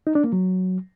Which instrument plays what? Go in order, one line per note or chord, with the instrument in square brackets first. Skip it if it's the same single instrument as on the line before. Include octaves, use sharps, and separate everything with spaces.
[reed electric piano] D#4
D4
A#3
F#3